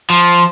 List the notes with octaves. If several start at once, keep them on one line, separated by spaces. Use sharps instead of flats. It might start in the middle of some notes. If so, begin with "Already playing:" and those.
F3